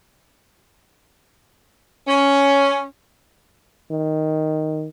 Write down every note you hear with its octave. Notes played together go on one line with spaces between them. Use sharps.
C#4
D#3